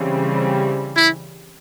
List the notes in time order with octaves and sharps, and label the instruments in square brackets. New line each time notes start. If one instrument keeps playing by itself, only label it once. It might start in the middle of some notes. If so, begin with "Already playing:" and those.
Already playing: [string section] C#3 E3 G3 C4
[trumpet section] E4